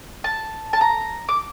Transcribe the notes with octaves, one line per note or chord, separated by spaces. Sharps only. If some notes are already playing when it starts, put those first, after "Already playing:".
A5
A5
A#5
D6